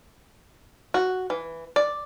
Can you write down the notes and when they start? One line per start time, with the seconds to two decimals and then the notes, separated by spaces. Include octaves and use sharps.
0.94 F#4
1.30 E3
1.76 D5